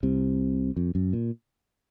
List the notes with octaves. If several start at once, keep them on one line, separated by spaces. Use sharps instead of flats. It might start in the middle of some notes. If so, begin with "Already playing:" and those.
C2 C3
F2
F#2
A#2